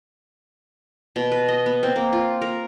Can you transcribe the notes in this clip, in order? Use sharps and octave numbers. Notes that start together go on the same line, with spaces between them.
B2
B4
D#5
B3
C4
A#3
F4
A#4